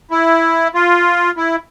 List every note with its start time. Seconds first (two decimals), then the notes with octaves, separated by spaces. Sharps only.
0.11 E4
0.75 F4
1.37 E4